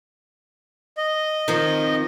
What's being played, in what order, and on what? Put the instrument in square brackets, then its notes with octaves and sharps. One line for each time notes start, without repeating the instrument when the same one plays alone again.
[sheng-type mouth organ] D#5
[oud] D#3 F3 C4